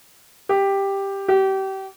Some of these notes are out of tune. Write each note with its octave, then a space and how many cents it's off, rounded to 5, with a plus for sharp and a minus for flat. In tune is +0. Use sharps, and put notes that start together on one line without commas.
G4 +5
G4 -30